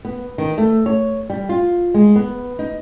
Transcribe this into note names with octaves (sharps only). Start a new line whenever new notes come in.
B3
D#3
A3
C#5
G3
F4
G#3
B3
D#4